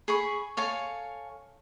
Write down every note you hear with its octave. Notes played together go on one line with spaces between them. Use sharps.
G#4 B5 C#6
A4 C#5 F5 G#5